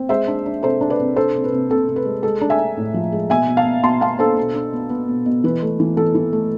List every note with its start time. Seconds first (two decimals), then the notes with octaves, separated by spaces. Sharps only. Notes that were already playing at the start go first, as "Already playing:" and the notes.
Already playing: C4
0.09 G#3 C5 E5
0.28 D4
0.46 D4
0.63 C3 A4 C5
0.81 D4
0.90 B4 D5
0.99 C3
1.16 D4 A4 C5
1.35 C3
1.44 B4
1.52 C3
1.70 C3 A4
1.88 C3
1.96 B4
2.05 G#3
2.23 G#3 A4
2.41 D4
2.50 E5 G#5
2.59 D4
2.77 A2
2.94 F3
3.12 G#3
3.30 B2 E5 G#5
3.49 B2
3.57 F5 A5
3.66 B3
3.83 B2 A5 C6
4.01 B3 F5 A5
4.19 D4 A4 C5
4.37 B2
4.55 D4
4.73 B3
4.90 B3
5.08 B2
5.26 B2
5.44 E3 B4
5.62 A3
5.80 E3
5.97 E3 A4
6.15 E3
6.33 A3